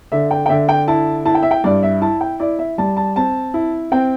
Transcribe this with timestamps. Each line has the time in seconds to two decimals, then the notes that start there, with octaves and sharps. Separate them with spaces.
0.12 D3 E5
0.31 G5
0.46 G5
0.49 D3 E5
0.69 G5
0.88 E4 A5
1.25 E4 A5
1.35 G5
1.43 E5
1.51 G5
1.64 G2 D5
1.83 E5
2.02 E4 A5
2.21 G5
2.40 E4 D5
2.59 E5
2.78 G3 A5
2.97 A5
3.16 C4 A5
3.54 E4
3.92 C4 G5